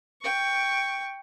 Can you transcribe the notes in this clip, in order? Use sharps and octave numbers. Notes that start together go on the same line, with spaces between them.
G5 C#6